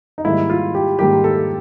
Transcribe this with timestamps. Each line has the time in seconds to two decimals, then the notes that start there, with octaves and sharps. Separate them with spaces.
0.18 D#4
0.25 G#2 D#3 G3 A#3 E4
0.50 F4
0.74 G4
0.99 G#2 D#3 G3 A#3 G4
1.24 A4